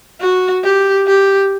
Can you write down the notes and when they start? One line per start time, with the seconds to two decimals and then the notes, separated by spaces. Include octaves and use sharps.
0.20 F#4
0.64 G4
1.07 G4